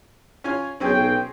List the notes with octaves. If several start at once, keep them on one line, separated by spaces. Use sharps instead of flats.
C#4 F4 G#5
B1 C4 C#4 G#4 G5